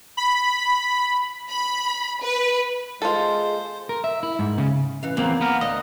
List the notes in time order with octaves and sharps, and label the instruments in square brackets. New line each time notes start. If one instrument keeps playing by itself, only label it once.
[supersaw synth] B5
[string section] B5
B4
[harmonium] G#3 [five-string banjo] F4 A4 [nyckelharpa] C5
[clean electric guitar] A#4
E5
E4
G#2
C#3
[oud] E3 F5 [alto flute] C#4
[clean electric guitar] E2 C4 [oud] A#3 [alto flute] F5
[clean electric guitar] B3 A#4
[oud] D2 [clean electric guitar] D#5